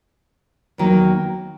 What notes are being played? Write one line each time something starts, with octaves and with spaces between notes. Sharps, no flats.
E2 D#3 F#3 A#3